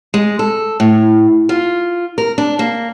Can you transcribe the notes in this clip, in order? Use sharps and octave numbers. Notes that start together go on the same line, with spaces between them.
G#3
A4
A2
F4
A#4
D4
A#3